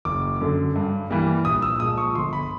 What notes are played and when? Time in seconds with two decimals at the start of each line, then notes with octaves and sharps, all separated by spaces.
0.05 F#1 D6
0.41 F#2 D3
0.76 G2
1.10 E3 G3 A#3
1.45 A#1 D#6
1.62 E6
1.80 A#2 F3 G#3 D#6
1.98 C#6
2.15 G1 C6
2.33 B5